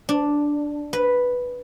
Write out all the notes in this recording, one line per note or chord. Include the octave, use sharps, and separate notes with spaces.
D4
B4